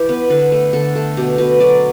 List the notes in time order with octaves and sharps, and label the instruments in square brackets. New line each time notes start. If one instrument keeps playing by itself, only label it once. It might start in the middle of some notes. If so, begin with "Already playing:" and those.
Already playing: [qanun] E3 G4 C#5
B3 B4
D3 B4
A3
D3 A4
A3
B2 G4
B2 B4
F#3 D5